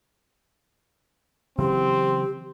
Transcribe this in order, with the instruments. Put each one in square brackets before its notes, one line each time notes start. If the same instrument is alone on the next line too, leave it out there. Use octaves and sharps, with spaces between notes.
[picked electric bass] C#3 E3 F#3 [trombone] C4 [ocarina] G4